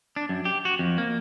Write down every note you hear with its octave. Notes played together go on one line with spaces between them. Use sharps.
D4
F#2
G4
F#4
F2
A#3